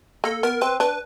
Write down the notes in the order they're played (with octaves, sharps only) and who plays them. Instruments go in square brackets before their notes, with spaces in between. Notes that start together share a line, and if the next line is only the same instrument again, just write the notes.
[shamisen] A#3 [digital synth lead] A4
[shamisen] B3 [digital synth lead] A#4
[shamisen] C4 [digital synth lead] B4
[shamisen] D4 [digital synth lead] B4